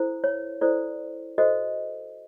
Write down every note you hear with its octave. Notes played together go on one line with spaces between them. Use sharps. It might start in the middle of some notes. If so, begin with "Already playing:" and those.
Already playing: E4 A4 C5
C#5
E4 A4 C5 D5
F#4 A4 C5 D#5